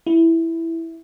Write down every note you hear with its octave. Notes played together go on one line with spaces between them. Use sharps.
E4